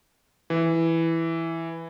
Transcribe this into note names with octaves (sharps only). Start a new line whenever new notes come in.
E3